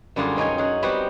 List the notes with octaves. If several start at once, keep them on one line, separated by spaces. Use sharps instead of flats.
F#2 D3 G3 F4 G#4
B2 C#4 D#4 G#5
C#4 G#4 F#5
G3 B3 C4 F#4 G4